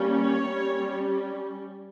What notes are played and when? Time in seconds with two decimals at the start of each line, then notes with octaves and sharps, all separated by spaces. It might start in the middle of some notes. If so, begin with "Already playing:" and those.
Already playing: G3 A#3 C#4
0.15 C#5
0.44 G3 C#4